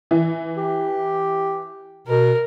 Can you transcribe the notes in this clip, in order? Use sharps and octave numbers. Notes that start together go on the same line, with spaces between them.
E3
G4
B2 A#4